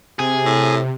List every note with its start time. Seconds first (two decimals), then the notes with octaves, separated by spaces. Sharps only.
0.20 C3 G#4
0.45 A2